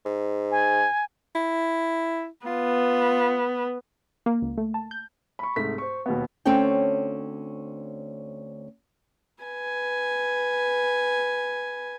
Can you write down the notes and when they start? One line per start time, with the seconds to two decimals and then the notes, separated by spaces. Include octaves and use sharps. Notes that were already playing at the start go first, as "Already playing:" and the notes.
0.05 G#2
0.51 G#5
1.35 E4
2.46 B3 F4
4.26 A#3
4.42 C#2
4.58 A3
4.74 A5
4.91 G6
5.39 B5 C#6
5.56 C2 G#2 A3 B6
5.78 C5 C#6
6.06 D#2 B2 B3
6.45 D2 C4 C#4 A4 C#5 G5
9.43 B4 G#5